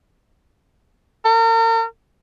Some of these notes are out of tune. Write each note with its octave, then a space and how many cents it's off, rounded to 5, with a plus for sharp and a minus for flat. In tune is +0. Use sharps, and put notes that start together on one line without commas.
A#4 -40